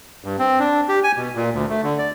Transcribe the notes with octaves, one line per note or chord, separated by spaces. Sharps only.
G2
C4
D4
G4
G#5
B2
A#2
D2
A3
D3
D5